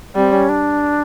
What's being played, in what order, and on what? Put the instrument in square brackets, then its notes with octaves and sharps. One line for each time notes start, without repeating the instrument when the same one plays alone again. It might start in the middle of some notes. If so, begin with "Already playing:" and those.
[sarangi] G3 [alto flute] C4
[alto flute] C#4
D4